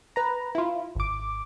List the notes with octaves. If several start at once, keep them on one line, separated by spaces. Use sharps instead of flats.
B4 A#5
E4 F4
G#1 D6